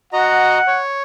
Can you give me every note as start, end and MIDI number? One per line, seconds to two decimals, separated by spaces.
0.13 0.58 66
0.13 0.58 75
0.13 0.82 78
0.13 0.58 82
0.67 1.03 73